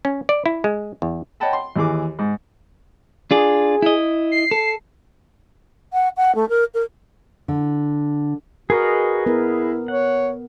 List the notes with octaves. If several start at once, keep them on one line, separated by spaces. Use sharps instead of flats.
C#4
D5
E4
G#3
E2
C#5 D#5 F#5 G5 A5 B5
C6
D#2 E3 G#4 D6
G#2
D4 F4 G#4 D5
E4 D#5
C7
A4
F#5
F#5
A3
A#4
A#4
D3
F#4 G#4 A#4 B4 D#5
B3 E4 A#4
C#5 F#5